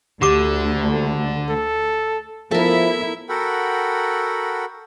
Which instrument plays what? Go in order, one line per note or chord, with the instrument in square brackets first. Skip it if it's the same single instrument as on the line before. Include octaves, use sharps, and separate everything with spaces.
[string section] D2 [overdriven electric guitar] D3 [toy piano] G4 D6
[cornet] A4
[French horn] F3 [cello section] B3 E4 [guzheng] A4 A#4 [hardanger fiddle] E5
[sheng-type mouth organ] F#4 A4 A#4 F#5 G5 B5